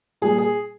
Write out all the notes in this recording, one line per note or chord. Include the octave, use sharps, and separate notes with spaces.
A#2 G3 G#4
G#4